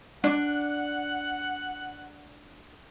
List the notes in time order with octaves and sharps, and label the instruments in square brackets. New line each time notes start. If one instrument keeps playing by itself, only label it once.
[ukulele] D4 [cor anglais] F#5